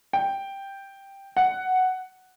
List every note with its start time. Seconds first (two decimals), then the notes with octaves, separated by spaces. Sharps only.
0.13 G5
1.37 F#5